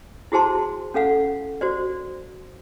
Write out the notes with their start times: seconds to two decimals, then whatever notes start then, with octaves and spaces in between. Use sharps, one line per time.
0.32 E4 F#4 G#4 C5 A5 C6
0.94 C#4 A4 F5 F#5
1.61 F#4 C5 D5